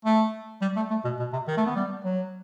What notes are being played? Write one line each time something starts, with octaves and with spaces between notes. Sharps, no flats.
A3
G3
A3
A3
B2
B2
C3
D#3
A3
B3
G3
F#3